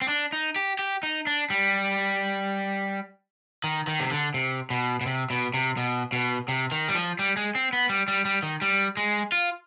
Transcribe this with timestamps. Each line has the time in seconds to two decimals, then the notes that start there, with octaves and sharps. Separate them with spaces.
0.01 C4
0.08 D4
0.33 D#4
0.56 G4
0.79 G4
1.03 D#4
1.27 D4
1.50 G3
3.64 D#3
3.87 D#3
4.00 C3
4.11 D3
4.34 C3
4.70 B2
5.01 B2
5.06 C3
5.30 B2
5.54 C3
5.77 B2
6.13 B2
6.48 C3
6.72 D#3
6.88 G3
6.95 F3
7.19 G3
7.37 G#3
7.55 C4
7.73 B3
7.89 G3
8.08 G3
8.25 G3
8.43 D#3
8.62 G3
8.97 G#3
9.32 F4